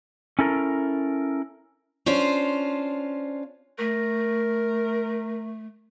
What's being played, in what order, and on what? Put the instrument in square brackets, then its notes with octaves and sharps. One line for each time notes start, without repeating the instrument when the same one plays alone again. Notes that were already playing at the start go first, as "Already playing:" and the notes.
[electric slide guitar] C#4 E4 A4 A#4
[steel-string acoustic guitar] C#4 D4 F4 C5
[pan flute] A3 [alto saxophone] A#4